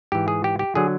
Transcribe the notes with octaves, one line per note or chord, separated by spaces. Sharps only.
G#2 E3 G4
G#4
G4
G4
D3 F#3 G#4